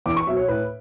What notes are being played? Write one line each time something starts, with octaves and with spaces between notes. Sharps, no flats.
E2 D6
C#6
B2 F#3 E5
C#5
A2 B4